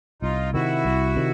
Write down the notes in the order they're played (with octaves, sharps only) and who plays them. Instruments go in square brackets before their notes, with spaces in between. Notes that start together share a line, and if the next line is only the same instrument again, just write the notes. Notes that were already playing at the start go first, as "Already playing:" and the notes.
[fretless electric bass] C2 [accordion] D#4 F4
[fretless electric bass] C3 D#3 [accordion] E4 F#4
[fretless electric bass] C2
C3 D#3